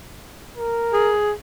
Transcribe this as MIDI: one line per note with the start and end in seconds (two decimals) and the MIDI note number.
0.58 1.13 70
0.93 1.32 68